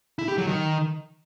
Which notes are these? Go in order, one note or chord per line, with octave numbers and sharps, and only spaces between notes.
E4
G4
F#3
D#3